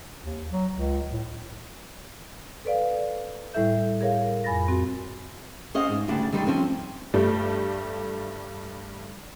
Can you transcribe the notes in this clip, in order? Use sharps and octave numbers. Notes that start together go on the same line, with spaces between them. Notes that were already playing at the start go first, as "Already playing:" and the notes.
D#2
F#3
C#2
A2
A4 B4 D5 F5
A2 G3 E4 A4 E5 G6
G#4 A#4 C#5 F5
F2 G#5 B5 A6 A#6
C4 F#4
C#4 C5 D#5 F5 F#5
G#2
D2 C#3 G3 D4 F#5
D3 D#3 G3 D#4
F3 C4 C#4
G2 G3 A3